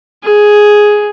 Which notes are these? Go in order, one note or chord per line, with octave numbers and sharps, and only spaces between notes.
G#4